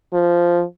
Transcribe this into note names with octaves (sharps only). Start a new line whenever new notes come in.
F3